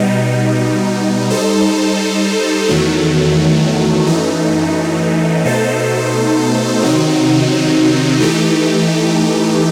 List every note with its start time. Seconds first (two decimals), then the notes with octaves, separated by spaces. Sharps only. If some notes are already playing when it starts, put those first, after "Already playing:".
Already playing: B2 G3 D#4
1.30 G3 D#4 A4 C5
2.69 E2 D#3 F#3 A3
4.07 F#2 E3 A3 D#4
5.45 B2 A3 D#4 A4 C5
6.82 C3 D#3 F#3 C4 D#4
8.20 E3 A3 D#4 G4